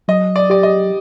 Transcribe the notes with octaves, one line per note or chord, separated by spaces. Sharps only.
F#3 D#5
D5
G4 D5
D#5